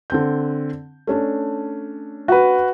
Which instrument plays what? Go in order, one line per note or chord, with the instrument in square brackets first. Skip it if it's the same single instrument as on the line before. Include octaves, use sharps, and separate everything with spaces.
[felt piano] D3 C4 G6
A3 C#4 D4
[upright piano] F#4 B4